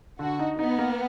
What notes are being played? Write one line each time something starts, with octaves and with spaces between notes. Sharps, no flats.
D3 F#4
D#4
B3 D#4
A#3